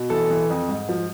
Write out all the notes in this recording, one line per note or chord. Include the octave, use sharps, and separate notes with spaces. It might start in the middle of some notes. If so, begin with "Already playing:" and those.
Already playing: B2
E3 A4
E3
F2
G#2
F3